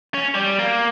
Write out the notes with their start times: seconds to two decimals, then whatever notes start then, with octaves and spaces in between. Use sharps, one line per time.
0.14 C#4
0.35 G3
0.59 A#3